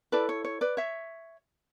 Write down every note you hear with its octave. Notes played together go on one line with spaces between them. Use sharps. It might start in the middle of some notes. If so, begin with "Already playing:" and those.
E4 A4 B4 D5
C#5
C#5
B4 D5
C#5 E5